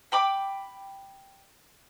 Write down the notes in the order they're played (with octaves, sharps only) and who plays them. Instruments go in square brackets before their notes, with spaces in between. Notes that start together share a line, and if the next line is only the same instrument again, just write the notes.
[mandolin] G5 B5 D6